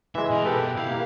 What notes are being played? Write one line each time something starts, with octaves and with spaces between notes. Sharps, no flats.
E3 G#3 E5
B2 A#4 D#5
G4 A4 B4
E4 F5 F#5
A#3